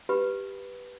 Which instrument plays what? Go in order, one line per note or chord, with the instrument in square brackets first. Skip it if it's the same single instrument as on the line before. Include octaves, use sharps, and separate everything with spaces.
[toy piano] G4 B4 B5